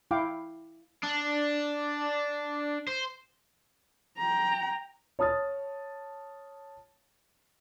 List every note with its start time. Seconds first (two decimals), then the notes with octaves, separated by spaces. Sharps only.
0.11 E4 F5 G5 D6
1.04 D4
2.88 C5
4.18 G5 A#5
5.19 C#5 A5 D#6 F6 A6